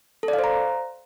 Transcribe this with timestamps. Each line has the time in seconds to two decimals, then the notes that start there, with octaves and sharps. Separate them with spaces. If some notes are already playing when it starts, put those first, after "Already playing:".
0.23 A4
0.28 D5
0.33 F5
0.39 C5
0.44 A#5